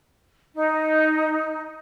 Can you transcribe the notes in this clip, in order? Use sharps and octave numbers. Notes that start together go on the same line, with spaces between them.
D#4